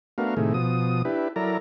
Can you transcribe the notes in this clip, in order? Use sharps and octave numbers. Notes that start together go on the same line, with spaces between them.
A3 B3 D4 F#4 A#4 F5
A2 C3 D#3 A3 G#4
B2 F3 D#6
D4 E4 G4 B4
F#3 E4 A4 A#4 D5 A#5